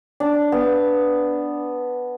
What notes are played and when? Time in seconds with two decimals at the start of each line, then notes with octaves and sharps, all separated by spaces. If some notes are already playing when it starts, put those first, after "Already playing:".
0.20 D4
0.52 B3